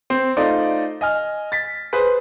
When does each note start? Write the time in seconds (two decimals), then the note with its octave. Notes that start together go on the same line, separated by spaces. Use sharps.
0.10 C4
0.37 A3 D#4 F4 C5 D5
1.01 D#5 G#5 F6
1.52 A6 B6
1.93 G#4 B4 C5